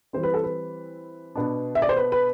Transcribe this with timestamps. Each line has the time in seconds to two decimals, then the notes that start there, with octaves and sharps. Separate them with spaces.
0.13 E3 G3 C4 C5
0.23 B4
0.34 A4
0.44 B4
1.35 B2 B3 D4
1.75 E5
1.82 D5
1.89 C5
1.97 B4
2.12 B4